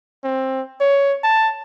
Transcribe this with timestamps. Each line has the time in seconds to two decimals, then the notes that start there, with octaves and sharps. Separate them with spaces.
0.24 C4
0.81 C#5
1.24 A5